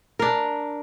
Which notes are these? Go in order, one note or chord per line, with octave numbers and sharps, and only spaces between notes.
D4 A#4